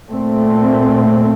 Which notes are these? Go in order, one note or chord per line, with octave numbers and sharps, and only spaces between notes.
A#2 A3 C4